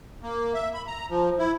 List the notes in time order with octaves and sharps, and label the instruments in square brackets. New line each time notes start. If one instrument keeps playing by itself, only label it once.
[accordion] A#3
E5
B5
A#5
F3
E4